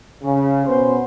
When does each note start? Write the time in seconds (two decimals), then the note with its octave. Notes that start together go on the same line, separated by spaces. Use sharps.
0.23 C#3
0.66 B2 B3 C#4 C5